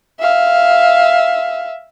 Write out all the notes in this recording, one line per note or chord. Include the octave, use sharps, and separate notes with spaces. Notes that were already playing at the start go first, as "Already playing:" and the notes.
E5 F5